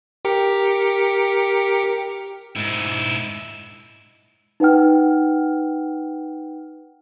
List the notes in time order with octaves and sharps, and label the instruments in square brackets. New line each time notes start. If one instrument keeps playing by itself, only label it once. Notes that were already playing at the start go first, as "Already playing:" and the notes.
[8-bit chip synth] G4 A#4 C#7
[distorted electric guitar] G#2 E4
[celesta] D#4 B4 F#5 G5 F6